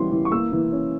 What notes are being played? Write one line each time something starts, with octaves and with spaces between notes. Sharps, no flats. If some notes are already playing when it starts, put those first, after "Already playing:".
Already playing: E3 G3 C#4 C6
E3
C#6
A#3 E6
E3
C#4